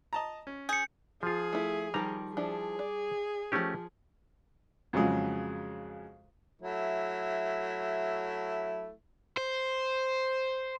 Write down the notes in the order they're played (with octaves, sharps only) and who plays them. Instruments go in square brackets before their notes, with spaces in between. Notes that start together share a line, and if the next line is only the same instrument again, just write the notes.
[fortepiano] D#5 A5 A#5
C#4
[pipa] G#4 [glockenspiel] G6 C#7
[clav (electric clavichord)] F3 F4 [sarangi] G#4
[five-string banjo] A3 E4
[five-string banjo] D#3 F3 G4 [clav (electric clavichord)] G3 A#5
[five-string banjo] F3 D4 E4 [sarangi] G#4
[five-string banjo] D5
[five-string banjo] E3 F3 [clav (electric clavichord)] A3 C#4 G4
[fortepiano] F2 C#3 F#3 G#3
[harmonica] F#3 A3 E4
[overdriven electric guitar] C5